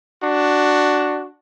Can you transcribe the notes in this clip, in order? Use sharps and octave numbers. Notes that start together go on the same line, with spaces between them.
D4 F#4